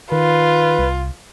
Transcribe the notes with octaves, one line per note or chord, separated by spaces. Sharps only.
D#3 F4 B4
C2